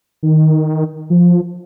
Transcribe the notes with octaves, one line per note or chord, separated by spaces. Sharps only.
D#3
F3